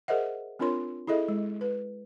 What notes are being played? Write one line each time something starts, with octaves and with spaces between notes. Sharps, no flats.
G#4 A#4 C5 D#5 E5 F#5
C4 D4 F4 A#4 C#5 C6
E4 G#4 A4 D#5 E5
G#3
B4